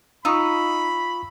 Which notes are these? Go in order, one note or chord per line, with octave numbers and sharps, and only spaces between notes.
D#4 F4 B5 C#6 D#6 E6